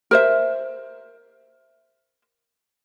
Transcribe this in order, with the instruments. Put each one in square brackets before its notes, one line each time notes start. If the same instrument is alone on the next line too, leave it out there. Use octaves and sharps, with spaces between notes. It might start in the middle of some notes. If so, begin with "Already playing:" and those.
[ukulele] A#4 C5 E5